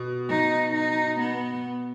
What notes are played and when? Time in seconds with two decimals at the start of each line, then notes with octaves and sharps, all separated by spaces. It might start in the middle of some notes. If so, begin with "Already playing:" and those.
Already playing: B2
0.29 D#4
0.74 D#4
1.20 B3